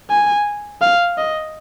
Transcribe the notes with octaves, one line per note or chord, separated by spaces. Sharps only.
G#5
F5
D#5